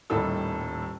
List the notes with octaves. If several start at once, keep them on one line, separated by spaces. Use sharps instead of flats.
D#1 A2 D#3 G3 A4 E6